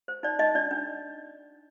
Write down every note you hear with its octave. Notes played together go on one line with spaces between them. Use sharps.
C5
D#4 D5
D#4 D#5
D4 D5
D4